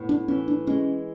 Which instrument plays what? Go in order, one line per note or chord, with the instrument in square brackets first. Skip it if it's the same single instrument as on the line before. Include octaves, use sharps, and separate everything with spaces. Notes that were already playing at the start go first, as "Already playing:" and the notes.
Already playing: [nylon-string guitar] A2 B3
[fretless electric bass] D4
[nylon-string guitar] E3 [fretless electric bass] C#4
[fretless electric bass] D4
[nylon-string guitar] G#3 [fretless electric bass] C#4